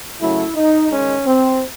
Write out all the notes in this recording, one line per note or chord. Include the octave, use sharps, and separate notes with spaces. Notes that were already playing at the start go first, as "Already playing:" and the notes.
C#3 F#3 A3 E4
D#4
D#3 G#3 C#4
C4